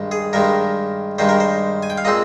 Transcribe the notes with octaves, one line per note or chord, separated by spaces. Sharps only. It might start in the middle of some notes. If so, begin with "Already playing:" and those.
Already playing: G2 D#3 G#3
G#4
G2 D#3 G#3 A#4
G2 D#3 G#3 C5
A#4
C5
G#5
G5
F5
A#2 G#3 C4 D#5